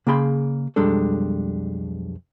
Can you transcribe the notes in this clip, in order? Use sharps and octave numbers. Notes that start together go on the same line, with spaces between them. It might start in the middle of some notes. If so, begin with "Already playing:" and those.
C#3 A#3 G#4 G5 B5 C6
B1 F2 G3 G#3 D4 A4